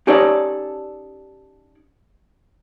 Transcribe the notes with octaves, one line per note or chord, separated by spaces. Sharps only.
C#4 D#4 G4 A4 C#5 D5